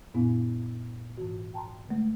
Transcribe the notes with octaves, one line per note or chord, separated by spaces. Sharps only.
F#2 A#2 B3 D4 E4 F5
G#2 E3 F#4
G5 A5 A#5 C6
D3 G#3 A3